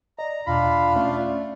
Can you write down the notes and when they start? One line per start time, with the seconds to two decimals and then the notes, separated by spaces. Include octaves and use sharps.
0.19 D5 D#5 A#5
0.47 E2 B2 D4 F4 F5 B5
0.96 A3 C#4 D5